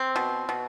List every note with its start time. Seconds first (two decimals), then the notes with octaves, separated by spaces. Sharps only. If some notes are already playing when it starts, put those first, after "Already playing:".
Already playing: C4
0.16 B2
0.49 B2